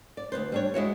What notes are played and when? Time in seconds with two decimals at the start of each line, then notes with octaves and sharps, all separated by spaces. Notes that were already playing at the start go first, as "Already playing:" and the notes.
0.17 D5
0.32 D2 G#2 B4 C5
0.52 G3 D4 C#5
0.74 G#3 E4 F#4 C#5